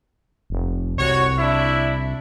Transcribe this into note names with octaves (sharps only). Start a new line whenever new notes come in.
F1
C2 F#4 C#5
D4 E4 E5